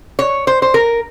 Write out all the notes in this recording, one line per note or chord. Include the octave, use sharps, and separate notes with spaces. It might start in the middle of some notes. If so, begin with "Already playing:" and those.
C#5
C5
C5
A#4